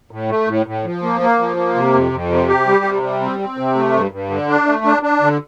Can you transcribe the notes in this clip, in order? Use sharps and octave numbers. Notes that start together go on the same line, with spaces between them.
A2
A3
A2
A2
F3
A#3
A#3
F3
A#3
C3
F2
F2
C3
G4
G3
C3
G3
C4
C4
C3
A3
G2
G2
D3
D4
A3
D4
D4
D3